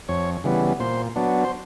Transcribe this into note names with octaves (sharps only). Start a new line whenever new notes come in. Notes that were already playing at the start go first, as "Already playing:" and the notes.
F2 C#5
C#3 E3 G3 B3
A#2 C5
F#3 B3 D4
C5